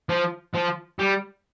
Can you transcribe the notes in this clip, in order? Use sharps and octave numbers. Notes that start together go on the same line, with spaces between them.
F3
F3
G3